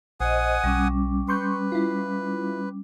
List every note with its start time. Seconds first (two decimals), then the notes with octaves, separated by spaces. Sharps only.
0.20 A#1 C5 D#5 F#5 G#5 D#6
0.64 B1 G3 C#4 D6
1.28 B4 C6 C#6 G6
1.72 E4 F4